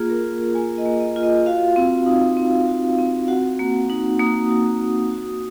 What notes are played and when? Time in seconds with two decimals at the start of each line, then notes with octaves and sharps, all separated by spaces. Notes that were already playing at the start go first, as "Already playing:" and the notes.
Already playing: A#3 F4 G#4
0.10 A#4
0.24 F4
0.54 A#3 G#5
0.78 D#5
0.86 A#3
1.00 D#5
1.16 F4
1.23 D#5
1.46 F#4 F5
1.76 C4
2.06 D#4
2.37 C4
2.67 F#4
2.99 C4
3.28 F#4 F#5
3.59 A#3
3.90 D#4
4.19 A#3 D#6
4.49 F#4
4.80 A#3
5.11 F#4